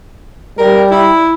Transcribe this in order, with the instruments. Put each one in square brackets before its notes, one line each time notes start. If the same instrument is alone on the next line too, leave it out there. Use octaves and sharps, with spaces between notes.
[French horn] G3 [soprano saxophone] A#4
[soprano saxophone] E4